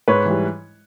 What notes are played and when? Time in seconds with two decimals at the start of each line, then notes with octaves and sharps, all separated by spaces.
0.08 G#2 B4 C#5
0.25 E3 G3